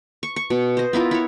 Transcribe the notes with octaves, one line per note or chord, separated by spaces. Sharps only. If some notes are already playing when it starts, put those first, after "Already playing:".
C#6
C#6
B2
C5 D#5
B3 E4 F4 A#4
E4 C#5